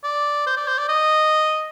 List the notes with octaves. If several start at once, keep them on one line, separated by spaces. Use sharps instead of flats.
D5
C5
D5
C5
D5
D#5